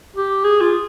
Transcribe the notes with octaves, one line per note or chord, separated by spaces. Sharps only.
G4
G#4
F4